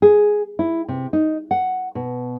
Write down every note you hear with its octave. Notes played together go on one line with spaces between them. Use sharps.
G#4
E4
C3
D#4
F#5
B2